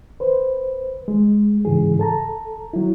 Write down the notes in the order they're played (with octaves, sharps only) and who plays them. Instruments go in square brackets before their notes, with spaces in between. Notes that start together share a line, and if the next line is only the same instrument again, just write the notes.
[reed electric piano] B4 C5
G#3
G#2 C#3 E3 G#4
A4 A5 A#5
F#3 E4